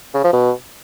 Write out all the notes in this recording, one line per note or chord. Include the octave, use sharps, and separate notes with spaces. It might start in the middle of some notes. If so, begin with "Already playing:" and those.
C#3
F3
B2